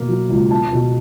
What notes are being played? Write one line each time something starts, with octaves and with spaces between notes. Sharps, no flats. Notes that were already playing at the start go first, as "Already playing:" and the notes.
Already playing: B2 A#3
F#3
C#2
B3 A5
B2